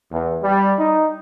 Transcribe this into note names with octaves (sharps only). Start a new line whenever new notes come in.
E2
G3
D#4